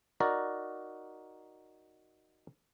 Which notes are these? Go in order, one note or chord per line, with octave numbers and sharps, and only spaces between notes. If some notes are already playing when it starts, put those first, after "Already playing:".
D#4 F#4 A#4 D5